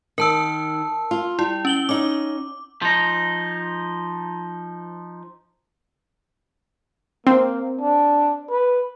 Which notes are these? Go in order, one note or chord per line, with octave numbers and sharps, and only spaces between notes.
D#3 A#4 A5 E6
F4
G3 E4
C#4 F#7 G7
C#4 D#4 D6
F3 D#4
A#3 C4
D4
B4